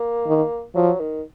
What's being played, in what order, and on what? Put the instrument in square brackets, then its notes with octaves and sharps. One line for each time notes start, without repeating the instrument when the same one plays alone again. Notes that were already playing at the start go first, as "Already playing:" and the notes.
Already playing: [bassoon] A#3
[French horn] D#3
[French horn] F3 [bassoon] F#3
[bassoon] D#3